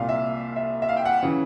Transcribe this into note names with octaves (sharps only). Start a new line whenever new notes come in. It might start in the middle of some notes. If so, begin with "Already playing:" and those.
Already playing: C2 A#2 F5
E5
E5
E5
F5
G5
F#5
C#3 E3